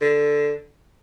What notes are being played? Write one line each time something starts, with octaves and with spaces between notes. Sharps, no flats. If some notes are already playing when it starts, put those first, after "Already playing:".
D3